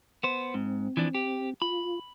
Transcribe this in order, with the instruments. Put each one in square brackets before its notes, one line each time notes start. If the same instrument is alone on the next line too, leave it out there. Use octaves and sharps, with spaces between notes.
[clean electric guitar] B3 C5
[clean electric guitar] G#2 [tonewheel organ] C4
[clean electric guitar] E3 F3 D4
G4
[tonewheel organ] F4 [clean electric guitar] B5